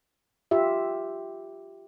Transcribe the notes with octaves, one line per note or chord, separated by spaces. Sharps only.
F4 G4 E5